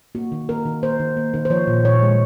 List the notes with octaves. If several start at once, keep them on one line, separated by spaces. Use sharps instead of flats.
A#3 F#4
D#3
A#3 A#4
D#3
A#3 C5
D#3
A#3
D#3
C5
F3 C#5
A#2
A#2 C#5
G#3